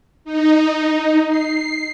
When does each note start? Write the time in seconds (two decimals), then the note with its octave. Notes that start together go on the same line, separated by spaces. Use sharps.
0.25 D#4
1.30 C7